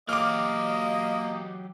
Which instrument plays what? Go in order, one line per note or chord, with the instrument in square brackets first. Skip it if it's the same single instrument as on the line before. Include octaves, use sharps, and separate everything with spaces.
[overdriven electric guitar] F#3 G4 [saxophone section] A#3 [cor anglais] D#5 [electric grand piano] D6 F6